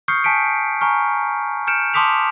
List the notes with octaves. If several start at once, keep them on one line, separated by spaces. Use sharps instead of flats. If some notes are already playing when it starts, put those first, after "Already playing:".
C#6 D#6 F6 G6 C7 C#7
G#5 A5 B6 C#7 D7
G#5 A#5 C#6 F6
F6 G6 C#7 D7 E7
A5 C6 D6 D#6 B6 F7